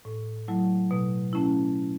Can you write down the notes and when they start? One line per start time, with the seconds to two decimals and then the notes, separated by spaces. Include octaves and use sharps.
0.05 A2
0.48 F#3 A3 E4
0.91 B2
1.33 A3 C#4 E4